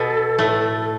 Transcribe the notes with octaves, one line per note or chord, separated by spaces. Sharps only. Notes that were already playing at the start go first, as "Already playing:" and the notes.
Already playing: B2 A4
A2 A3